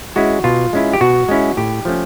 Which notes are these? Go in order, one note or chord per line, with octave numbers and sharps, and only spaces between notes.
G#3 C#4 E4 F#4
B2 F4
G#3 C#4 E4
G4
B2 F#4
G#3 C#4 E4
A2 G4
F3 A3 C#4